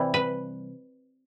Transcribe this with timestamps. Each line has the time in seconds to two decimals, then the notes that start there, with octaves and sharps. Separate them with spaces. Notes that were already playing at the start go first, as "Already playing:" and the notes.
Already playing: C3 E3 G3
0.14 B4